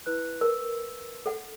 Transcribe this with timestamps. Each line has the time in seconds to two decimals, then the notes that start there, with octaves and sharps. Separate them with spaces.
0.06 E4 B4 F#6
0.41 A#4 B4 E6
1.26 A4 F#5